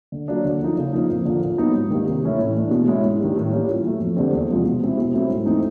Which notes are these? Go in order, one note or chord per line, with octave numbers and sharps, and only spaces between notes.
D3
F#3 A#3 D4
D3
F3 A#3 D#4
C#3
F3 A#3 D#4
F2
D3 F3 A#3 D4
A#2
F#3 B3 D#4
G#2
D#3 G3 A#3
C3
E3 A3 C#4 E4
A2
E3 A3 D4
B2
G#3 C#4 E4
G#2
D#3 G3
A2
E3 G3 A#3 C#4
A#2
F#3 A3
F2
D3 G3 C4
E2
C3 F3 G#3
B2
G#3 C4 E4
B2
F#3 A3 C4 E4
G#2
E3 A3 C4 D#4